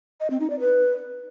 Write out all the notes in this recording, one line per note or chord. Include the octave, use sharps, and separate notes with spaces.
D#5
C4
D#4
D5
B4